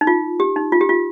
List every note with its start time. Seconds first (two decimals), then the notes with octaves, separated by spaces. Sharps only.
0.01 D#4
0.07 F4
0.40 G4
0.56 D#4
0.72 F4
0.81 G4
0.89 F4